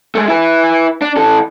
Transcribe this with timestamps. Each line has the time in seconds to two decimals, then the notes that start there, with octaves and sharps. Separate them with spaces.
0.15 G#3 A3
0.28 E4 B4
1.02 D4
1.17 E3 A4